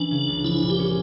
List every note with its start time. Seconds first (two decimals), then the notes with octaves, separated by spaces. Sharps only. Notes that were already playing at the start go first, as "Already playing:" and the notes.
Already playing: E3 C#4 D4
0.11 C#3
0.28 C#2
0.44 F3 E4
0.62 A#2
0.70 G4
0.79 C#4